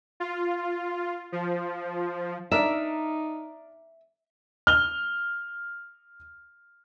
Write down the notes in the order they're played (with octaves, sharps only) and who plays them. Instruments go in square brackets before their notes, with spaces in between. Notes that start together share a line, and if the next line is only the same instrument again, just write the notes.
[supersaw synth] F4
F3
[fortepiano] D4 A#4 D5 [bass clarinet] D#4 [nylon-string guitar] E5
[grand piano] F6 G7